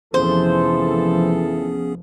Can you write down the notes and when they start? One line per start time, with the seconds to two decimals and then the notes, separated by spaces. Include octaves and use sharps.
0.14 F1 E3 F3 B3 C#4 G#4 A4 C5